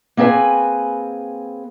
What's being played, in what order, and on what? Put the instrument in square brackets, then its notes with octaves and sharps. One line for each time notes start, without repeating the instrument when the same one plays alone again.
[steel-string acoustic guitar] A#3 C4 G#4 B4 G#5